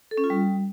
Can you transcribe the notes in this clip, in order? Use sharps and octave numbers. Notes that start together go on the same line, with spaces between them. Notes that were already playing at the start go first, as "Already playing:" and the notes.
A4
C#4
F4
G3